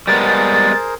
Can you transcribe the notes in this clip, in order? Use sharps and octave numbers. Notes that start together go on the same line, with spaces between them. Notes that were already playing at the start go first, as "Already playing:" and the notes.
G3 G#3 B3 G#4 A#4 C5 A6